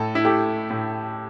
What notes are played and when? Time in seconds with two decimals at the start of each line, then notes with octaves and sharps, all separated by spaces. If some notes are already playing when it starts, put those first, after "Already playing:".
Already playing: A2 A4
0.15 E4
0.25 A3 G4
0.70 A2